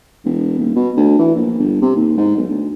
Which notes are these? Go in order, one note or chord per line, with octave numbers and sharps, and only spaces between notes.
E1
D#1
B2
D2
E3
A#1
G1
C3
D#2
G#2
B1
D2